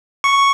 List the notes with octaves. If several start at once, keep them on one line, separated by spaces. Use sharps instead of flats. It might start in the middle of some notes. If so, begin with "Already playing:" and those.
C#6